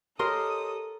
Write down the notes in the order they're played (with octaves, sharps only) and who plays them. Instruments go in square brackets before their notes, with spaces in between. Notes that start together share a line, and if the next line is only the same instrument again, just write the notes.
[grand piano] G4 C#5 [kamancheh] A4 D#6 [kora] A#4 [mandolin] D#5 C6 F6